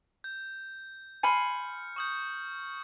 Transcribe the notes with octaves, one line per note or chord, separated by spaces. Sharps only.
G6
G#5 B5 C6 F6 C#7
C#6 D#6 G6